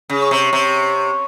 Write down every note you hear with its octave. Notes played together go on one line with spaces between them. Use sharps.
C#3
C#5
C3
C3